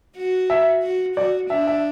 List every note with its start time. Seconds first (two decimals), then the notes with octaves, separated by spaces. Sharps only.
0.17 F#4
0.50 E5
0.83 F#4
1.16 F#4 D5
1.50 D4 E5
1.67 E5